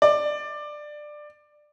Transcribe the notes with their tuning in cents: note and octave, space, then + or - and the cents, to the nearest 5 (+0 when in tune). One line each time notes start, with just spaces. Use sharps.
D5 +15